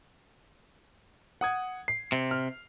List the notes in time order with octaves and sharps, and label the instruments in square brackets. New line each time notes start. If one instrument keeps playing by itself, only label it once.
[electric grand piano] F#5 D#6 G#6
C7
[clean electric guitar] C3
[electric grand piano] F6